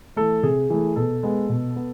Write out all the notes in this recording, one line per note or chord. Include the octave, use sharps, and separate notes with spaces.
E3 A3 A4
C3 G#4
E3 A3
B2 A4
G#3 B3
B2
B3